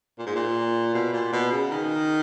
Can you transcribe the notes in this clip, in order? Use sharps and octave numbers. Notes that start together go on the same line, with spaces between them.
A#2
G#2
A#2
B2
A#2
B2
C#3
D#3